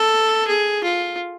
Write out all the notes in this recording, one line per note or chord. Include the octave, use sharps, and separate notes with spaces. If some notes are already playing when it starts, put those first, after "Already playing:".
Already playing: A4
G#4
F4